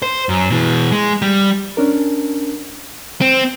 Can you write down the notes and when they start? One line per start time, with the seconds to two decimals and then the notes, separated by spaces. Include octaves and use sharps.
0.02 C5
0.29 F#2
0.50 B2 E3
0.92 G#3
1.22 G3
1.77 C#4 D4 A#4
3.21 C4